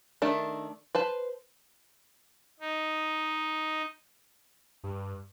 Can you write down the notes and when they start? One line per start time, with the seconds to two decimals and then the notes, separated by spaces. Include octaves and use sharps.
0.22 D#3 A3 D4
0.95 B4 C5 A5
2.60 D#4
4.83 G2